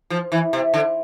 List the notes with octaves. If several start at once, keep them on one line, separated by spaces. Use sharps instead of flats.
F3
E3
C3
D3